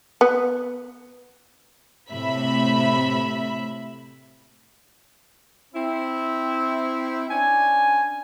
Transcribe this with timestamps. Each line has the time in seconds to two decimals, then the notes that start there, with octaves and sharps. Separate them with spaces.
0.21 B3
2.12 A2 C3 E5 B5
5.75 C4 E4
7.30 C#4 D4 G#5